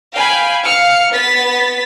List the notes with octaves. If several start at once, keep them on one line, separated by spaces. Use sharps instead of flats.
F5 G5 G#5 B5
F5 F6 C#7
B3 A6 B6